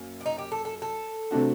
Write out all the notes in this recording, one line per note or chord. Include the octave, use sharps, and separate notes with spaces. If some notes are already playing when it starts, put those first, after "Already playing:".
Already playing: F#2 A#3
D4
D#4
G4
A4
A4
A4
C3 F#3 A3 D4 F#4